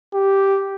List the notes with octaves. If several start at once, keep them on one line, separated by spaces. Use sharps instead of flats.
G4